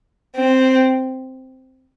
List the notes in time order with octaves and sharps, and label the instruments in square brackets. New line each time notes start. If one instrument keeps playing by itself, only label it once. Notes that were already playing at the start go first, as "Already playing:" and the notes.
[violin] C4